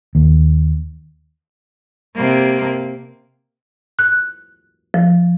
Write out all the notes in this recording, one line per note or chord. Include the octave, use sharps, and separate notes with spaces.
D#2
C3 A#3
F#6
F3